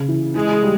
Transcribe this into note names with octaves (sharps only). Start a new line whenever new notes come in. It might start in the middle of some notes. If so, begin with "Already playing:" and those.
Already playing: C#3
E3
E3 G#3
G3